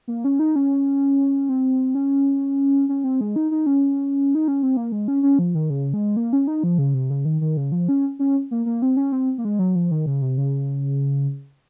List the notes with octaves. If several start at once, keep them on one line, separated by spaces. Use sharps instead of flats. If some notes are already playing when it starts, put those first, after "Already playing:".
A#3
C#4
D#4
C#4
C4
C#4
C#4
C4
G#3
D#4
D#4
C#4
D#4
C#4
C4
A#3
G#3
C#4
C#4
F3
D#3
C#3
G#3
A#3
C#4
D#4
F3
C#3
C3
C#3
D#3
D#3
C#3
F3
C#4
C#4
A#3
A#3
C4
C#4
C4
A#3
G#3
F#3
F3
D#3
C#3
C3
C#3